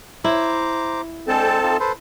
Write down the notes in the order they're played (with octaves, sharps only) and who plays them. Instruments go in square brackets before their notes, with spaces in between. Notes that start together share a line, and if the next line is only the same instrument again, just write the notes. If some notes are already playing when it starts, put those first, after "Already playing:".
[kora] E4 [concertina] C5 A#5 D6
[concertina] G#3 D4 G5 [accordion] C4 A4 A5
[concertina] D#4 F4
A4 B4 C5